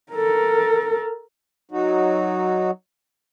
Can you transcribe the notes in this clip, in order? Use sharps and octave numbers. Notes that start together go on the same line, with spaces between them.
A4 A#4
F#3 D#4 F#4